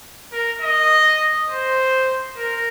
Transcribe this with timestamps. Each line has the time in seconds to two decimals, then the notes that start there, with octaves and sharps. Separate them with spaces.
0.32 A#4
0.61 D#5
1.50 C5
2.37 A#4